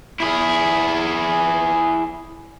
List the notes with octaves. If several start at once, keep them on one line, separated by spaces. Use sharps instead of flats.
E4 G#4